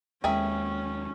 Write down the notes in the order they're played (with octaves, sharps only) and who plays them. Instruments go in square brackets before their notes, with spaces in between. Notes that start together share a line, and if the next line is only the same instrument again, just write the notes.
[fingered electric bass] D#2 G#3 [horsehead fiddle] C#4 [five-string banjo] G#4 A#4 E5 [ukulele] G5 G#5